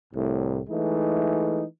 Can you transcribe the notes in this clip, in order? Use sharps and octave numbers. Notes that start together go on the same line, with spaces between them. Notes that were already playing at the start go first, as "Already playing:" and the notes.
C2 A2
E3 G#3 A3 D#4